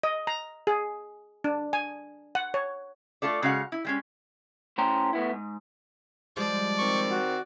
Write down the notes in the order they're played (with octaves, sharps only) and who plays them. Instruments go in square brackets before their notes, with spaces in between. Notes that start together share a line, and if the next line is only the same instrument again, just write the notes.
[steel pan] D#5
A#5
G#4
D4
G#5
F#5
C#5
[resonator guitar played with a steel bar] A3 F4 A4 D5
C#3 G#3 F#4 F5 F#5
E4
G3 G#3 C#4
[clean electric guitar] A2 A3 C#4 C5 G5 A#5
A2 B3 E4
G#2
[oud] F3 G3 G#3 [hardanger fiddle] D5
[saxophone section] D#3 C4 [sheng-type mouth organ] C#6
[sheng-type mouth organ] F#4